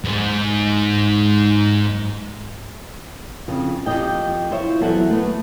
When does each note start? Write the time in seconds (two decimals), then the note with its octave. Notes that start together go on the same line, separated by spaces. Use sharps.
0.05 D#2 G#2
3.48 F2 C#3
3.86 F2 A#2 G4 D#5 G5
4.51 E4 F4 C5 C#5 E5
4.81 E2 F#3 A4 E5 F#5
5.10 A3 B3